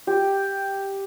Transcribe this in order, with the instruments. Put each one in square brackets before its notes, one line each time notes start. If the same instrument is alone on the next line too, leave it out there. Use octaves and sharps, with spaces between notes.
[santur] G4